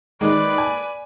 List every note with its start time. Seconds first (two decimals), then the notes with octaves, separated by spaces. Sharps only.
0.21 D#3 G#3 B4 D5
0.58 G#5